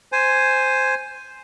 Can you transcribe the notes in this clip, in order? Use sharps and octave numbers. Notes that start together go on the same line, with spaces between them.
C5 G#5